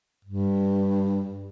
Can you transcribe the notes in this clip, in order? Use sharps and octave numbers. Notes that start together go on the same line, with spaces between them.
G2